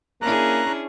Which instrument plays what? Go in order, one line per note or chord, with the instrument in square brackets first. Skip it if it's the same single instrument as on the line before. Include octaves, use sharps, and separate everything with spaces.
[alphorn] A#3 [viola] C#4 [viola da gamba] D4 E4 G#4 [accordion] A#5 F#6